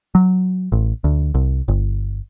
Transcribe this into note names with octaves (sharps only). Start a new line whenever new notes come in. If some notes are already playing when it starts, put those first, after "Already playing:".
F#3
A1
D2
C2
G1